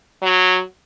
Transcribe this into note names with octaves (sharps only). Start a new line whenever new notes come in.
F#3